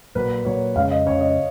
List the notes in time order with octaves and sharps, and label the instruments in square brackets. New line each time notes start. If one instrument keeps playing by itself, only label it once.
[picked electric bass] A#2 F#3 A#3 [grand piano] B4
[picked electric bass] A#2 F#3 A#3 [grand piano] C#5
[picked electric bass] F2 C#3 G#3 C#4 [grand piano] F5
[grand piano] D#5
[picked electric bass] F2 C#3 G#3 C#4 [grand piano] C#5
[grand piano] D#5